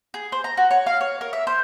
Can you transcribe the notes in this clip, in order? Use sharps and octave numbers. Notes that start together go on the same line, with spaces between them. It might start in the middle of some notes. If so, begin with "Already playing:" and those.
G#4
C5
A#5
F#4
C#5
F5
C#5
A#4
E5
C5